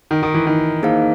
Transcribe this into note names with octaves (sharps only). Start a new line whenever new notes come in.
D#3
D#3
E3
D#3
A#3 D#4 G#4 C5 F5